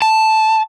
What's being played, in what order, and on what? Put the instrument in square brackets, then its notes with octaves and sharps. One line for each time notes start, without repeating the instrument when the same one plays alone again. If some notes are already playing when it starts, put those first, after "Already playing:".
[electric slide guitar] A5